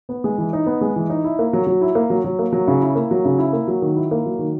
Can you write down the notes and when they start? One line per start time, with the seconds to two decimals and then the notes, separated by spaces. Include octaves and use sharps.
0.09 B3
0.24 G#3
0.38 E3
0.53 D#4
0.66 B3
0.81 G#3
0.96 E3
1.10 D#4
1.24 E4
1.39 A#3
1.53 F#3
1.67 F#3
1.81 E4
1.95 A#3
2.10 F#3
2.24 F#3
2.39 A#3
2.53 F#3
2.68 C#3
2.81 E4
2.95 A#3
3.11 F#3
3.25 C#3
3.38 E4
3.53 A#3
3.68 F#3
3.82 D#3
3.96 E4
4.11 A#3
4.26 F#3
4.39 D#3